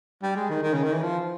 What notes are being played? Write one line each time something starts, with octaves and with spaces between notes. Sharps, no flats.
G3
G#3
D#3
D#3
C#3
D#3
E3
F3